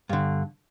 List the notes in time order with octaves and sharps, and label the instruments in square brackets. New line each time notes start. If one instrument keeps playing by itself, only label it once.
[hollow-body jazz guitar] G2 D3